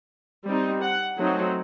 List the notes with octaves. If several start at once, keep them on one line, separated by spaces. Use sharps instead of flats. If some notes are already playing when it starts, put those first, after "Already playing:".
G3 C4 D#4
F#5
F#3 A3 C4 D#4